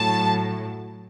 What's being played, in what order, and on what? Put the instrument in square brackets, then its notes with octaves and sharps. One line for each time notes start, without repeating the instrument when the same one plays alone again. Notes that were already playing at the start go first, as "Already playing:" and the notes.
Already playing: [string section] A2 F#3 A5